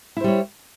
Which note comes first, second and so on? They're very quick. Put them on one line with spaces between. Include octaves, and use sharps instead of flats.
E4 C5 G3 C#5